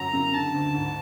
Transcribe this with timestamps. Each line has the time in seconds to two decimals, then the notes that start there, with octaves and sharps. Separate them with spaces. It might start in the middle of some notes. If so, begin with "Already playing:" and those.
Already playing: F#2 F#3 A#5
0.13 C#3
0.34 D3 A5
0.54 D2
0.74 G#2